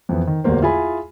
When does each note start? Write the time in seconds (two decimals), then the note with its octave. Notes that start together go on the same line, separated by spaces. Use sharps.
0.09 F2 E3 B3
0.27 D#3
0.44 D1 A1 E2 A2 A#3 C5
0.62 E4 F4 G#4 G#5 B5